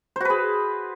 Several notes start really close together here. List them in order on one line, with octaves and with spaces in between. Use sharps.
C5 F#4 B4 G#4